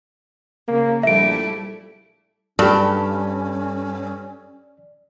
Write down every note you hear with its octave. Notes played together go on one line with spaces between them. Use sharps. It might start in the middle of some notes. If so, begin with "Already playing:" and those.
C#3 A#3
A#1 G3 A3 E4 E5 D7
G2 C#4 G4 A4 D5